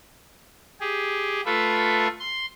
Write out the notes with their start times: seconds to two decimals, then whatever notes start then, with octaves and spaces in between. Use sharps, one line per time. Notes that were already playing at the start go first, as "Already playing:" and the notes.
0.80 G4 G#4
1.46 A3 F4 A4 B4 E5
2.20 C6